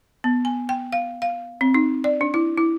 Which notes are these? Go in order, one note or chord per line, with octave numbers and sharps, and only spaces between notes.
B3
G#5
G5
F5
F5
C4
D#4
D5
D4
E4
E4